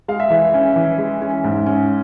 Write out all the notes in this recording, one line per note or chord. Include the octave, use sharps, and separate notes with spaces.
G#3 F5
E5
E3
C#4
E3
G#3
C#4
G#2
C#4